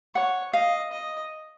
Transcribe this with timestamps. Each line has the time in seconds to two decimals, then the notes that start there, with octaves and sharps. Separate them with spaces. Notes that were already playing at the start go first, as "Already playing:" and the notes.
0.15 C#5 F#5
0.53 D#5 F5
0.92 D#5